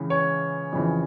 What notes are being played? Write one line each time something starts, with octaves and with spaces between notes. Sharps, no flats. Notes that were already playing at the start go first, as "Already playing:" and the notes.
Already playing: C#2 C#3 E3
C#5
F2 C#3 E3